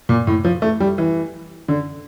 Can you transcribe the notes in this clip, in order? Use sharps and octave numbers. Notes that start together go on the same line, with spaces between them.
A#2
A2
F3
A3
G3
E3
D3